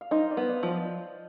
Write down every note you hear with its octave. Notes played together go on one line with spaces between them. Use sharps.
F5
D#4 C5 D#5
D5 F5
B3
D5 F5
F3
C5 D#5